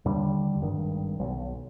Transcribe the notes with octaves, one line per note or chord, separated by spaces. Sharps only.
D#2 D3 G3
G#1 G2 D#3
B1